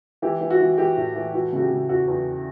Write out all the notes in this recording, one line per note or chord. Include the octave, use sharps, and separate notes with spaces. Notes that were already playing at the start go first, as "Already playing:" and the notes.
E3 G4
E3
F#4
E3
E3 G4
A2
E3
E3 F#4
C#3 F#4
G4
C#3
E2 F#4
E2